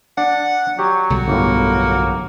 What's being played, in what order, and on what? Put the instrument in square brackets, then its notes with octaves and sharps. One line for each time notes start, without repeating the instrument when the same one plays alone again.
[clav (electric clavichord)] D4 [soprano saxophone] F#5
[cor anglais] F#3 [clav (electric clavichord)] G4
[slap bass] B1 D3 G3 [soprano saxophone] F#4
[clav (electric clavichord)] G1 A2 [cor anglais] A#3